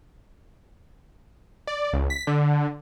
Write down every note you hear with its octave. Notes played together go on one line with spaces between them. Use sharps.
D5
C#2
B6
D3